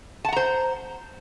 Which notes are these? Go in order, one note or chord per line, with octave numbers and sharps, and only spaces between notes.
C5 F#5 A5 A#5